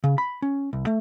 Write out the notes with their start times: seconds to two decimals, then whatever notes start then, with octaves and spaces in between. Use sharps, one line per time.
0.04 C#3
0.18 B5
0.42 C#4
0.73 C2
0.87 A3